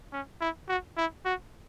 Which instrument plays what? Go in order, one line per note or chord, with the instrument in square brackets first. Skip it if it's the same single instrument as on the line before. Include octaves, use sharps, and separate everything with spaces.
[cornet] C#4
E4
F#4
E4
F#4